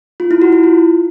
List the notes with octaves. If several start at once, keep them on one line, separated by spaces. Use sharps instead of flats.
F4
E4
F#4
E4
F4